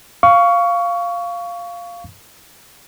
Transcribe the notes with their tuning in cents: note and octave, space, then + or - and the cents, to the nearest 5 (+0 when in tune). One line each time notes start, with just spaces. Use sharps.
F5 -5 C#6 +20